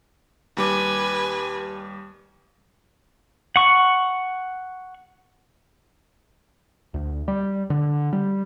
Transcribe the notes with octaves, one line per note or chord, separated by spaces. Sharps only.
D#2 G3 B4 G#5 D6
F#5 C#6
D2
G3
D3
G3